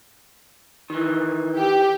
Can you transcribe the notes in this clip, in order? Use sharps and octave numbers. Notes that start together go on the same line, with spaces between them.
D#3 E3
G4